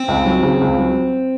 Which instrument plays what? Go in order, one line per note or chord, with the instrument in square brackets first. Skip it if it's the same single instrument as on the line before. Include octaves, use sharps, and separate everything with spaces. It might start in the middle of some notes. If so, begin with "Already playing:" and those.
Already playing: [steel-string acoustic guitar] C4
[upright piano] C#2
F#3
C#3
C#2
F#3